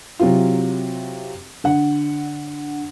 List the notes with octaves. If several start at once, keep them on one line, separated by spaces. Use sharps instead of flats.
C3 F#3 E4 F4
D3 F#5